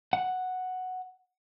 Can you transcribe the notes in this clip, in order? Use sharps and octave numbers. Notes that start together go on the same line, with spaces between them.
F#5